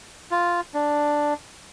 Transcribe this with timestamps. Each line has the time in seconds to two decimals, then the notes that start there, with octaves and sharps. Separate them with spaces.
0.31 F4
0.74 D4